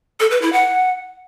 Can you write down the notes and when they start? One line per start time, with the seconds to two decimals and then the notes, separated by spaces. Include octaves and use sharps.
0.20 A4
0.31 B4
0.42 E4
0.53 F#5